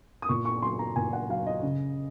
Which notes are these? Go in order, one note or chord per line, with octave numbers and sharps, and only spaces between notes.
D#6
A#2 C#6
C#6
F#3 C6
A#5
A#2 G#5
F#5
F#3 F5
D#5
C#3